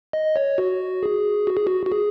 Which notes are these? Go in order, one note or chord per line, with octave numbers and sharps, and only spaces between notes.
D#5
C#5
F#4
G#4
F#4
G#4
F#4
F#4
G#4